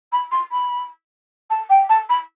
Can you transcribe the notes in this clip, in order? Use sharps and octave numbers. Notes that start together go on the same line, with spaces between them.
B5
C6
B5
A5
G5
A5
B5